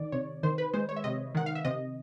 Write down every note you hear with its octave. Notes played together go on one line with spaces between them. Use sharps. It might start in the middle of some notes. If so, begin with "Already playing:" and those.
Already playing: D#3 D5
C3 C#5
D#3 C5
B4
G#3 C5
C#5
E5
C3 D#5
D#3 F#5
F5
E5
C3 D#5